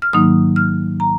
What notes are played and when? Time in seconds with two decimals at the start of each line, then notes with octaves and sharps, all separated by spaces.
0.02 F6
0.13 G#2 D#3 F#3 A#3 D#4 D#6
0.56 F6
1.00 A#5